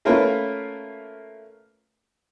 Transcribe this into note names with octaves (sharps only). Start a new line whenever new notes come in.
A3 A#3 C#4 F4 A#4 B4